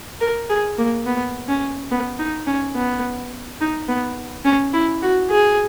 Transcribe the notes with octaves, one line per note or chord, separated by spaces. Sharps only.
A#4
G#4
A#3
B3
C#4
B3
D#4
C#4
B3
D#4
B3
C#4
E4
F#4
G#4